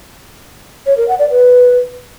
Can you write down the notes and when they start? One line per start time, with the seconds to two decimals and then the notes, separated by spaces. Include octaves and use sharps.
0.86 C#5
0.97 A#4
1.08 F#5
1.19 D5
1.30 B4